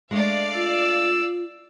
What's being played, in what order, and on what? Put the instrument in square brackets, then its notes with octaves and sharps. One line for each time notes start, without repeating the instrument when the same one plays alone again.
[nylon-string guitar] G#3 A3 D4 [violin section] D5 F5
[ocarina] F4 [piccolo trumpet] E6